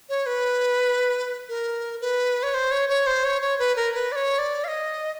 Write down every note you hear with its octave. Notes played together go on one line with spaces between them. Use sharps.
C#5
B4
A#4
B4
C#5
C5
C#5
C#5
C5
C#5
C#5
B4
A#4
B4
D5
C#5
D5
F5
D#5